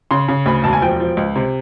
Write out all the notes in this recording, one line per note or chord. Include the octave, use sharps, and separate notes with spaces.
C#3 C6
C#3
D2 B5
E1 A5
G#5
F3 G5
F3
C#2
C3